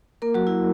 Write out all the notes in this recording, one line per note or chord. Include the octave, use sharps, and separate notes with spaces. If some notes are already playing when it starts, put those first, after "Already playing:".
A#3 A#4
F#3 F#4
E4